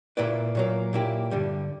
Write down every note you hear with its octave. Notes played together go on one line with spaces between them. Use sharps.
A#2 A#3 E4 B4 D5
A#2 F#3 A#3
A#2 A#3 E4 G4
G2 D3 G3